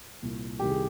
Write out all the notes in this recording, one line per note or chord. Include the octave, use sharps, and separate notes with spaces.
C2 A#2
C2 C3 D#3 G4
G#4